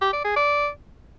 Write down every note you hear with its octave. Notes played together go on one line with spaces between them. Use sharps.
G4
D5
G#4
D5